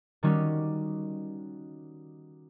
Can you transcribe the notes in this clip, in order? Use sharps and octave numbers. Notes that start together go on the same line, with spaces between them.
D#3 G3 C#4 F#4